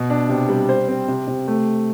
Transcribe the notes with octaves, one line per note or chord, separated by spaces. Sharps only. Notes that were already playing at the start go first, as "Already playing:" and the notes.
Already playing: B2
D4
C3
G3
C5
C4
C3
C3
A3